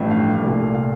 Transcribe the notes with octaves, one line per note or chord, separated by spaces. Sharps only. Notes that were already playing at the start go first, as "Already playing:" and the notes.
Already playing: A1 G2 F3 A3
F5
C2 A#2 A3
F5